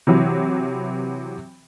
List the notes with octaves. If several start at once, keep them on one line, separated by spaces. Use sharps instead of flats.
C3 E3 F#3